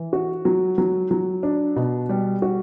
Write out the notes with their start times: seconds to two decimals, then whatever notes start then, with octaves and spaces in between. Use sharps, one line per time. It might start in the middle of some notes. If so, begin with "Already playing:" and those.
Already playing: E3
0.13 F#4
0.45 F#3
0.78 F#3
1.11 F#3
1.43 D4
1.76 B2
2.09 G3
2.42 F#4